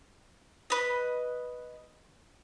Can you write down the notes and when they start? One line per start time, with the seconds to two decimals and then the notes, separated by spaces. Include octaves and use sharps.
0.70 B4 D#5